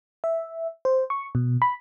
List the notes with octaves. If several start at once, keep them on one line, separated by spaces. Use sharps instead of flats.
E5
C5
C#6
B2
B5